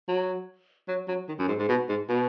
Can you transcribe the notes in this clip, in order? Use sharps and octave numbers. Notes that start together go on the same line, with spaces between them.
F#3
F#3
F#3
D#3
F#2
G#2
G#2
B2
G#2
B2